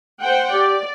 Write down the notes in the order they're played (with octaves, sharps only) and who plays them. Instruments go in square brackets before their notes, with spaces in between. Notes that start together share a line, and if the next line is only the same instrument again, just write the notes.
[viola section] C5 F#5 G5
[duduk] G4 [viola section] D5